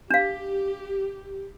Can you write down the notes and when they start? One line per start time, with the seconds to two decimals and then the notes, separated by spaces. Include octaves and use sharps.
0.11 D4 G4 F5